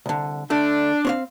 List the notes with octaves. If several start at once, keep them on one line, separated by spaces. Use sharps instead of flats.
C2 D3
D3 A3 D4
C4 C#5 F5